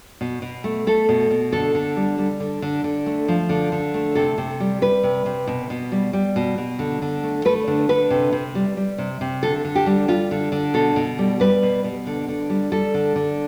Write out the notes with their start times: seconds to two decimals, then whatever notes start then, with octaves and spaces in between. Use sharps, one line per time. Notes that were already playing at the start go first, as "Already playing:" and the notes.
0.21 B2
0.42 B2
0.64 A3
0.87 A3 A4
1.09 B2
1.31 B2
1.52 D3 A4
1.75 D3
1.96 G3
2.18 G3
2.40 D3
2.62 D3
2.84 D3
3.06 A3
3.28 F3
3.49 D3
3.72 D3
3.94 A3
4.15 C3 A4
4.38 C3
4.60 G3
4.81 G3 B4
5.04 C3
5.26 C3
5.47 B2
5.70 B2
5.92 G3
6.13 G3
6.36 B2
6.58 B2
6.79 D3
7.02 D3
7.23 A3
7.45 A3 B4
7.68 D3
7.89 D3 B4
8.10 C3
8.33 C3
8.55 G3
8.77 G3
8.98 C3
9.21 C3
9.43 D3 A4
9.65 D3
9.75 G4
9.86 G3
10.08 G3 F4
10.31 D3
10.52 D3
10.74 B2 A4
10.96 B2
11.19 G3
11.40 G3 B4
11.63 B2
11.84 B2
12.07 D3
12.28 D3
12.50 G3
12.72 G3 A4
12.94 D3
13.16 D3